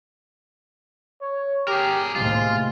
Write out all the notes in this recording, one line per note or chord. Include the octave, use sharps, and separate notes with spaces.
C#5
G4 G#4 A#4
D#2 A2 C3 G#3 F4